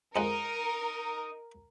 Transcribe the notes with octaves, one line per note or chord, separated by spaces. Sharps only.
F2 G#3 D#4 A#4 F#5